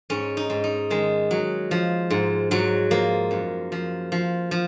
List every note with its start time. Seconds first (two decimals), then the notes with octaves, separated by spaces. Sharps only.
0.10 G#2 C#4
0.37 D#4
0.50 G#2
0.64 D#4
0.90 D#3 G#3
1.31 F#3
1.71 F3
2.10 G#2
2.51 G#2 F#3
2.91 F3 A#3
3.31 F#2
3.72 F3
4.12 F3
4.51 F3